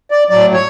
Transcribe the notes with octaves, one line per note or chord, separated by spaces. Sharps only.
D5
A2 F#3 D5
C#5